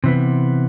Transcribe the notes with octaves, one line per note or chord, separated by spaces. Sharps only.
C3 E3 B3